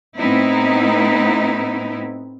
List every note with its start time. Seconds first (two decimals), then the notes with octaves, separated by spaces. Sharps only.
0.19 A2 B3 C4 D#4 E4